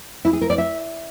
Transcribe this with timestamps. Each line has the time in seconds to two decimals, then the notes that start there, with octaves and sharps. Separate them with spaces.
0.25 E4
0.33 G#4
0.41 A#4
0.50 D5
0.58 E5